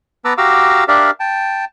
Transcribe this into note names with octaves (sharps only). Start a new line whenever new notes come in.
B3 B4 A5 A#5 D6 E6
F#4 G4 F5 A#5 D6 E6
D4 G4 A#4 D5 E5 F5
G5 A5